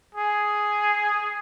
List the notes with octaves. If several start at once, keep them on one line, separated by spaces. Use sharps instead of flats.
G#4